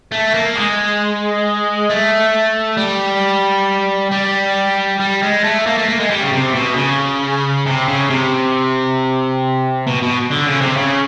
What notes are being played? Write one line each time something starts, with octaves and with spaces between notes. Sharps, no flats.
A3
A#3
G#3
A3
G3
G3
G3
G#3
A3
A#3
A3
A#3
G#3
G3
C#3
C3
B2
C#3
C3
C#3
C3
B2
B2
D3
C#3
C3
C#3